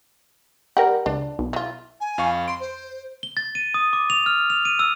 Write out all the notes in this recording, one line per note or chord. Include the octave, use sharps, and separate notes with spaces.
G3 G4 A#4 F#5
C#2 D4
B1
E3 F4
G#5
F2 F5 C#6
C6 D7
C5
G7
A6
D#7
D#6
D6
F7
F6
F7
D#7
E6